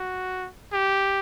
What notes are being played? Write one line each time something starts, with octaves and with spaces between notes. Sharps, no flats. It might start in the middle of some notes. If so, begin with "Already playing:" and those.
Already playing: F#4
G4